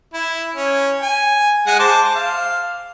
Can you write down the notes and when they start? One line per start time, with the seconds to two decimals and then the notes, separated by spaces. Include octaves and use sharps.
0.14 E4
0.55 C#4
1.02 G#5
1.67 G#3 F#5 G#5
1.79 C5 A5 D6
2.15 F5